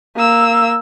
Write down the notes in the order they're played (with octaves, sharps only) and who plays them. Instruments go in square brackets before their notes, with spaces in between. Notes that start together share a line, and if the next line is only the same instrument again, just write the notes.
[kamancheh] A#3 E6